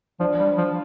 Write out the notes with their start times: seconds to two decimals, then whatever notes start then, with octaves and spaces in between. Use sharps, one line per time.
0.20 F3 D4
0.40 G3
0.58 F3